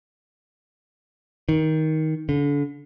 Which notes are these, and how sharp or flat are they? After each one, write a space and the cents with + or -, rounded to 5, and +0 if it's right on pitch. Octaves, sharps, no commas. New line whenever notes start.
D#3 +15
D3 -35